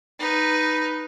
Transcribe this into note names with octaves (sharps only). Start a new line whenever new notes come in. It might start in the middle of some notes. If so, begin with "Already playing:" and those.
D#4 B4